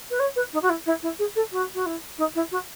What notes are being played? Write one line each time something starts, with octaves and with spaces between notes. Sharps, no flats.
B4
C#5
B4
D#4
F#4
E4
E4
E4
G#4
A4
F#4
F#4
E4
D#4
E4
F#4